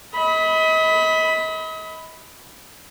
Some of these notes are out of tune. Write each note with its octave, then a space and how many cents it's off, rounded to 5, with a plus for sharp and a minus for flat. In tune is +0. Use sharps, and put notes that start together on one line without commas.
D#5 +40 B5 +0